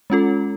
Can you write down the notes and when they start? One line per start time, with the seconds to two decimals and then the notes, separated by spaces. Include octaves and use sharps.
0.10 G#3 C#4 F4 A4